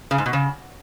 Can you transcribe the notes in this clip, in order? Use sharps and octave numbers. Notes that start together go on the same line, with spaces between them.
C#3
G#2
B2
C#3